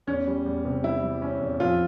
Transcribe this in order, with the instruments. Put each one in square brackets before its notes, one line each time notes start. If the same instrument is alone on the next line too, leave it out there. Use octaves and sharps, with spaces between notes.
[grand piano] E2 [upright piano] C#4
[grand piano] G3
E2
C3
[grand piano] G3 [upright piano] E4
[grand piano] G3
C#4
E2
[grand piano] F2 [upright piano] F4